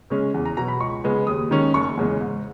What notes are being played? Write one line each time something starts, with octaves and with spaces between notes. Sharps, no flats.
C#3 G#3 C#4
E2
A#5
B2 F#3 A#5
B5
C#2 C#6
C#3 G#3 B3
D#2 D#6
D#3 G#3 C#4
F#1 C#6
E2 C#3 G#3
G#2